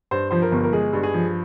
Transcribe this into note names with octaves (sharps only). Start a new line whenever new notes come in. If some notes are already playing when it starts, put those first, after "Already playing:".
G2 C5
F3 C5
A#4
G1
A#4
G#3 G#4
G2
G#4
F3